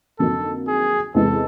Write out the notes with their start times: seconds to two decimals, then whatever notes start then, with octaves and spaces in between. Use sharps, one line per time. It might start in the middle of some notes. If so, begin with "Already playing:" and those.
0.19 F2 D3 F#3 A#3 D#4 A4
0.67 G#4
1.14 E2 C3 E3 G#3 C4 A4